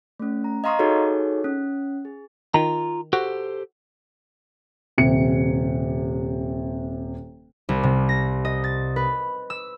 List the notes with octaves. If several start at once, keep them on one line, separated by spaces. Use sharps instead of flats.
A3 C#4
A#5
D#5 F5 A#5 C6 C#6 D#6
D#4 F#4 G#4 A4 C#5
C#4
G#4
D#3 F4 A#5
F#4 G4 A4 C5
D#1 C3 C#7
C2
C3
A#6
D#5
A6
B4
E6